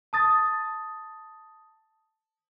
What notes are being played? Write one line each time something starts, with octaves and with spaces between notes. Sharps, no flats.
A5 D#6 A6